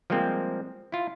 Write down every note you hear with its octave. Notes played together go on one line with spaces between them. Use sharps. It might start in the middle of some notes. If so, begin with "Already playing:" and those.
F3 G3 G#3 A#3 C4
E4 F4